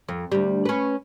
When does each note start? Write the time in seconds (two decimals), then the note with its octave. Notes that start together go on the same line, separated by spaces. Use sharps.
0.09 F2
0.32 D2 G3
0.66 C#4 B4